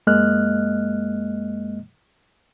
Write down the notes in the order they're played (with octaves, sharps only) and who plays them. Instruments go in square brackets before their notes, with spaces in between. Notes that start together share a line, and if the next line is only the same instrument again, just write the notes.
[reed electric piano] F#2 G#3 A#3 D#5 F6 F#6